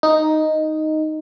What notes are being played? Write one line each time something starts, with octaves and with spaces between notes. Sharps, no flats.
D#4